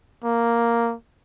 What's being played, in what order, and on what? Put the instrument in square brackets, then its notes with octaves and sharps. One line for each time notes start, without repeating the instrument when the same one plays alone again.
[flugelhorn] A#3